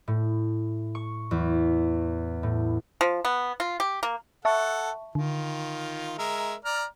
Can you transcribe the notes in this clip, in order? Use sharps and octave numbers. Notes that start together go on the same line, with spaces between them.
A2
C#6
E2
A2
F3
B3
F4
G4
A#3
A4 E5 F#5 A5 C#6
D3 D#3 F4
G#3 A#4 E5
D5 A#5 F6